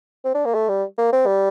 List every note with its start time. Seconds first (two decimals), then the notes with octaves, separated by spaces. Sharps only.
0.25 C4
0.34 D4
0.45 A#3
0.54 A3
0.69 G3
0.98 A#3
1.13 C4
1.26 G3